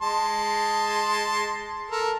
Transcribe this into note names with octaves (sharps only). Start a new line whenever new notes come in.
G#3 A5 C6
A4 A#4